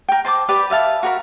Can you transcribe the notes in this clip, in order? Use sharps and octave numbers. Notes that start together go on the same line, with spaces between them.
A#4 G5
C5 A5 C6 D6
G4 B4 D5 B5
D5 E5 F5 A5
F#4 A#4 B5